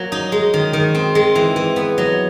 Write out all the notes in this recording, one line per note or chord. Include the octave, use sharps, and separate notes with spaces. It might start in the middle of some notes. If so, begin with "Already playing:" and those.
Already playing: F#3 A#3
D#4
G#3
D#3
D#3
C4
G#3
E3
E3
B3
F#3